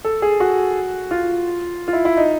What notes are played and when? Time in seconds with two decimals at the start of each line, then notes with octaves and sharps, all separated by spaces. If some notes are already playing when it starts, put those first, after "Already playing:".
0.05 A4
0.22 G#4
0.40 F#4
1.11 F4
1.88 F4
1.93 E4
2.05 E4
2.17 D#4